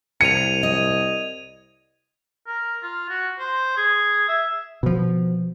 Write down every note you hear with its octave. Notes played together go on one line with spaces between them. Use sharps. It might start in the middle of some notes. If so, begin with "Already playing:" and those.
C2 G#6 C#7 D#7 F7
D#5
A#4
F4
F#4
C5
G#4
E5
B2 F3